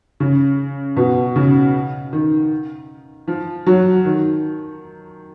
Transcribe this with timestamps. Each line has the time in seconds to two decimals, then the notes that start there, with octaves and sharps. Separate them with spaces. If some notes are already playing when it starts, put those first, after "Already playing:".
0.20 C#3
0.97 B2
1.36 C#3
2.13 D#3
3.28 F3
3.66 F#3
4.05 D#3